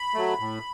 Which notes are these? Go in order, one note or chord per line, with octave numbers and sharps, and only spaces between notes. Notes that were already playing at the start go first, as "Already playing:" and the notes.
Already playing: B5
F#3 A3
A2